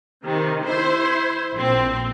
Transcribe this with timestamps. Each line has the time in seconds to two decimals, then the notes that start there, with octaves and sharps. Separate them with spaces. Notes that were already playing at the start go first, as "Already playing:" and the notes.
0.24 C3 D#3
0.64 E4 C5
1.54 A#1 C4